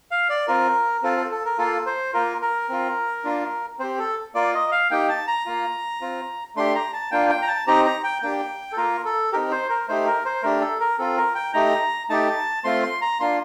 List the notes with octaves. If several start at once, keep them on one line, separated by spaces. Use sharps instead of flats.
F5
D5
C4 F4 A#4
C4 F4 A4
A4
A4
A#4
A#3 F4 A4
C5
A#3 F4 A#4
A#4
C4 F4
A#3 D4 F4
C4 G4 C5
A4
A#3 F4 D5
D#5
F5
A#3 D#4 G4 G5
A5
A#5
A#3 F4
C4 F4
A3 D4 G4 C6
A#5
A5
A#3 D4 F4 G5
G5
A#5
A5
C4 D#4 G4 A#5
A#5
G5
A#3 D4 G4 G5
A4
A#3 F4 A#4
A4
C4 D#4 G4 A#4
C5
A#4
A3 D#4 G4 C5
A#4
C5
A3 D4 G4 A#4
A4
A#4
C4 F4 A4
A#4
G5
A3 D#4 G4 A#5
A3 D#4 G4 A5
A3 C4 F4 C6
C6
A#5
A#3 D4 F4 C6